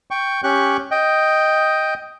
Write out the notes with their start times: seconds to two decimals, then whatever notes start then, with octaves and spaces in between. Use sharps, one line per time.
0.11 G5 C#6
0.44 C#4 G4 C#6 F#6
0.91 D#5 G5